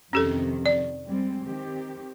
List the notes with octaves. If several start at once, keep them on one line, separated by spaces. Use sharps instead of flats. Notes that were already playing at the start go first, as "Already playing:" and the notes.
F2 C3 D#3 C#4 G4 A4
D5
G3 G#3 C4
D#3 C4 G4